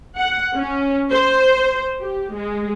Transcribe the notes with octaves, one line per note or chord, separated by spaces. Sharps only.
F#5
C#4
C5
G4
G#3